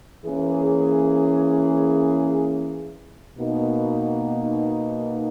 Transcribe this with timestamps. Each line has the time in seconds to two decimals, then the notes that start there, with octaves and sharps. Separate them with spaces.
0.25 E3 A#3 C#4 G#4
3.38 B2 A#3 D#4